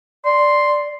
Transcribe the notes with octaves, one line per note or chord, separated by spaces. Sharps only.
D5 C6